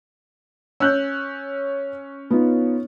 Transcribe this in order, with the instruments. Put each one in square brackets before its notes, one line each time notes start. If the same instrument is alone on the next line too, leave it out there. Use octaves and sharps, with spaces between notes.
[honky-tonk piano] C#4 [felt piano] E6 F#6 G6
[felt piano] B3 D#4 F4